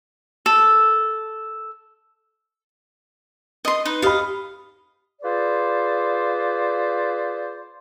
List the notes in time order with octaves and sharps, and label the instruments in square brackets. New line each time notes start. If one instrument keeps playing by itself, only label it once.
[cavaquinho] A4
D#5 C6
D#4 B4
[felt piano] G4 B5 [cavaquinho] D#5 F5
[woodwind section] F4 G#4 B4 C5 D5